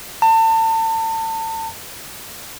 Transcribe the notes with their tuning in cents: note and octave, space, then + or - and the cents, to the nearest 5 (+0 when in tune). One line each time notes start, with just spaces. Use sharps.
A5 +35